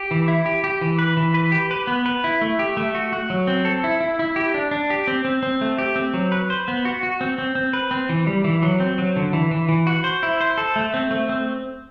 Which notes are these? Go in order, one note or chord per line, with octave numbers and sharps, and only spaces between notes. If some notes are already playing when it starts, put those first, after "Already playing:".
Already playing: G4
E3
E4
G4
G4
E3
B4
E3
B4
G4
B4
B3
B4
E4
A3
G4
A3
F#4
F#4
F#3
C4
A4
E4
E4
E4
G4
D4
D4
G4
C4
C4
C4
A3
G4
C4
F#3
B4
C5
B3
F#4
F#4
C4
C4
C4
B4
C4
E3
G3
E3
F#3
C4
F#3
D3
E3
E3
E3
F#4
C5
E4
C5
A4
A3
C4
A3
C4